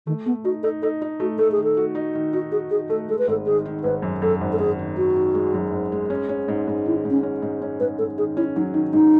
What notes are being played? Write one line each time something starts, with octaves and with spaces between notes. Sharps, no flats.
D#3 A3
A3 B3
D#4 F#4
D#4 A4
D#4 A4
D#4
A3 F#4
A3 A4
G#4
D#3
A4
F#4
D#4
D#3
D#4 F#4
F#4 G#4
D#3 G#4
A3 A4
G#3 A4
B4
G#1 A4
D#3 G#4
D#3
G#1 B4
F#2
F#2 A4
G#1
A4
G#1 G#4
D#3
D#3 F#4
D#3
G#3
F#2
G#1
G#3
C#4
C#4
G#2
G#2
D#3 E4
G#2
C#4
C#4
G#2
C#4
G#2 B4
G#2 A4
D#3 G#4
C#4 E4
F#3 D#4
D#3 D#4
G#2 D#4